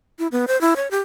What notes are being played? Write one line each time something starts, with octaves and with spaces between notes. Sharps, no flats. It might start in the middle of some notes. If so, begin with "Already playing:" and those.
E4
B3
C5
E4
C#5
G4